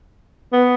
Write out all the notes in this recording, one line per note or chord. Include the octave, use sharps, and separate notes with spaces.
B3